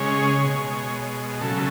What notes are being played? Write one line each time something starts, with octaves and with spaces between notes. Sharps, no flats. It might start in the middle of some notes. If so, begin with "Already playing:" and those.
Already playing: C#3 G#3 C#5
B2 G#3
C#3 F#3 A4